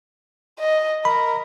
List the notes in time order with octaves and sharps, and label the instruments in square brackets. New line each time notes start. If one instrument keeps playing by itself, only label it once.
[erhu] D#5
[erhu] A#4 [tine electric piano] B5